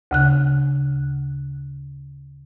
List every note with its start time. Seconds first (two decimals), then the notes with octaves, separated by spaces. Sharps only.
0.11 D2 C#3 F#6